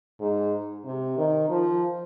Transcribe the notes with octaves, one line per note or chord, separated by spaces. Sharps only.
G#2
C3
D#3
F3